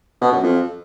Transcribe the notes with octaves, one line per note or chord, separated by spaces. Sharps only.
B2
F#2
F2